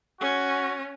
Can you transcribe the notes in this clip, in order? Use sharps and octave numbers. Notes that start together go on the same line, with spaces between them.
C#4 F#4